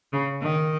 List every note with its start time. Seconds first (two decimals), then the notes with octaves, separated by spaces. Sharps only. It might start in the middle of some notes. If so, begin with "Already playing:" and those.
0.13 C#3
0.42 D#3